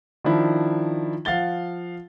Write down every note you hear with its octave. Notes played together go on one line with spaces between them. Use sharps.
D#3 F3 D4 E4
F3 F5 F#5 A6 G7